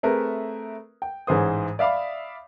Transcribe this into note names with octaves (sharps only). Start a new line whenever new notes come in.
A3 C4 G#4 A#4 B4 E5
G5
A1 G#2 E3 G#4 C5 D#6
D5 E5 F5 B5 D6